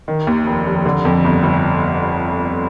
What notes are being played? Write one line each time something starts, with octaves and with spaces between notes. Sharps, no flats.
D#3
D#2
F1
F1
D3
F2
G1
G1